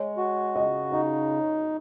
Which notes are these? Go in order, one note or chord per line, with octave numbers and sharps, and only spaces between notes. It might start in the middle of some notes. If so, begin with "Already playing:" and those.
Already playing: G#3 C#5
F#4
C#3 D#5
D#4 D#5